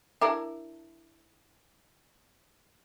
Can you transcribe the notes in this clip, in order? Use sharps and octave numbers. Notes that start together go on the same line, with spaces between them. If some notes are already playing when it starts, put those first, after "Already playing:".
D4 E4 A#4